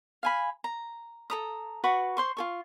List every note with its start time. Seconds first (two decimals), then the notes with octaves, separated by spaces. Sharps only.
0.23 F5 G#5 B5
0.64 A#5
1.30 A4 A#5 D#6
1.84 F#4 B4 B5 C#6
2.17 C5 C6 C#6
2.37 F4 A4 C#6